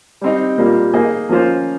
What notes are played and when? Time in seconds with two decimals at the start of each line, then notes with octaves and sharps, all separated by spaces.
0.21 G3 C4 D#4
0.58 A#2 G3 A#3
0.94 A#3 D#4 G#4 D#5
1.29 F3 A#3 C#4 F4 C5